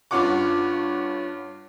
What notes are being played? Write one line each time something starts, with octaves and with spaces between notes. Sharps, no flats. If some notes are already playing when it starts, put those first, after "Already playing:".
G2 C#4 F4 C#5 F#5 D6